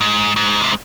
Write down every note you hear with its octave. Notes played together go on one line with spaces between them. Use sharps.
G#2
G#2
C3